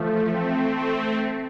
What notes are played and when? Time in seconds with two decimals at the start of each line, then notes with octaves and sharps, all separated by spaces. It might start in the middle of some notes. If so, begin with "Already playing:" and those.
Already playing: E3 F3 A3
0.33 A3 C4
0.76 A3 C4